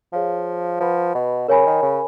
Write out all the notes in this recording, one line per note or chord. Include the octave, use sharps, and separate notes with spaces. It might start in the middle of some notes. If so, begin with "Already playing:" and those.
F3 G#4 C#5 F5
F3 B4 F#5 B5
B2
C#3 A#4 C#5 G#5 B5
D#3
C#3